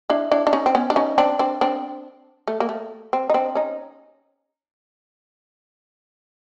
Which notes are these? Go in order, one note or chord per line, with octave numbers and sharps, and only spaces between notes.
D4 E4
D4 E4
D4
C#4 D#4
C4
B3 C#4
D4
C#4 D#4
C4 D4
C4 D4
C4 D4
A3
A#3
A3
C4
D#4
C4 D4
C#4 D#4